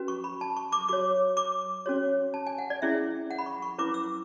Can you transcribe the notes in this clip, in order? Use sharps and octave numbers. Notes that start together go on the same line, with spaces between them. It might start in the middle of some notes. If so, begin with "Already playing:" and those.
Already playing: C#4 F#4 B4
C#6
B5
A5
C#6
D6
F#4 C#5 D6
D6
C#4 F#4 C#5
A5
G#5
F#5
D5
C#4 E4 G#4 E5
F#5
B5
C#6
C#6
C#4 E4 B4 D6
E6